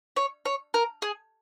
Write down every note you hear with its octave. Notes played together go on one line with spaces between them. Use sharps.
C#5
C#5
A#4
G#4